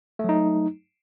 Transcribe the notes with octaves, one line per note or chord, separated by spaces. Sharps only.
F#3 A3 D#4